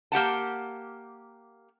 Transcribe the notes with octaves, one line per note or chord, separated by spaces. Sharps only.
A#3 G4 F#5 A5